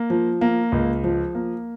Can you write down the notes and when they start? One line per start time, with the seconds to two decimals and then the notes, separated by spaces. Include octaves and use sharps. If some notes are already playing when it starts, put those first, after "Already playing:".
Already playing: A#3
0.10 F3
0.41 A#3
0.72 C#2
1.04 F3
1.35 A#3